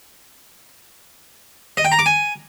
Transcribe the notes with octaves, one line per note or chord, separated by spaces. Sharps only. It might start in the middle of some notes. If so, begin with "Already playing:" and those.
D#5
G5
A#5
D6
G#5